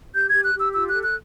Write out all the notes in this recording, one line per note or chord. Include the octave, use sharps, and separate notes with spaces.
G4 G6
G4 G#6
F#6
G4 E6
F4 E6
A4 F#6
F#6